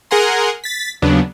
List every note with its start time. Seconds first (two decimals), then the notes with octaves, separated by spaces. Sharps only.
0.11 G#4 A#4 F#5 G#5 A#5 C6
0.64 A6 B6
1.02 D#2 C#3 F#3 B3 D4